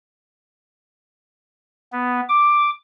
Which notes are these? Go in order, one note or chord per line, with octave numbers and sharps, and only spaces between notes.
B3
D6